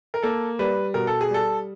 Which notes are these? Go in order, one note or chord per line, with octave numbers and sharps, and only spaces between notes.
A#4
A#3 A4
G3 B4
B2 A#4
A4
G#4
G3 A4